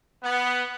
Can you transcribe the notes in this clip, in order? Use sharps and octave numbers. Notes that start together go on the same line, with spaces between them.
B3